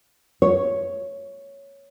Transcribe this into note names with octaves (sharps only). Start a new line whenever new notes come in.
C#5